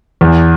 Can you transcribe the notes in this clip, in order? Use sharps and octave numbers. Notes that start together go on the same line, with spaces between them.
E2